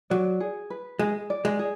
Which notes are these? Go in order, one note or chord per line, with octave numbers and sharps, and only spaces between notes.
F#3 D5
G#4
B4
G#3 G#4
D5
G#3
G#4